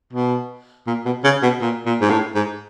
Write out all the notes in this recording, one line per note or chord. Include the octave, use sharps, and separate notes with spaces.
B2
A#2
B2
C#3
B2
A#2
A#2
G#2
A2
G#2